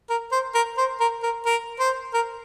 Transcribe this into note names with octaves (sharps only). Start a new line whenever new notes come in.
A#4
C5
A#4
C5
A#4
A#4
A#4
C5
A#4